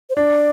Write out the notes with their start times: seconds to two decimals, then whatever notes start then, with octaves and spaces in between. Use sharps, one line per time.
0.10 C5
0.16 D4 D5